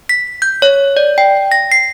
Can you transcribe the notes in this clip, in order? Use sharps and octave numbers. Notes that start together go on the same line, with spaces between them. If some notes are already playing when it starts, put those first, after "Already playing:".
B6
G6
C#5
D5
G5
A#6
C7